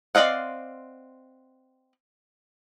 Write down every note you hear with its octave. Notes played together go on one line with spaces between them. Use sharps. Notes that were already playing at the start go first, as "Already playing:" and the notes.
C4 D5 D#5 F5 F#5